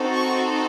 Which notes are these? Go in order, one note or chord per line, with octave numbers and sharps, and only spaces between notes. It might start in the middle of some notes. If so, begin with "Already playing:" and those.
Already playing: C4 D#4 F#4 A4
C#6